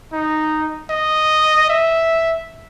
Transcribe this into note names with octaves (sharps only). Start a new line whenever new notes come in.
D#4
D#5
E5